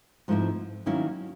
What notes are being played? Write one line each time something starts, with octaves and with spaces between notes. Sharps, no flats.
G#2 F3 A3 C4 E4
D#3 F#3 A#3 C#4 E4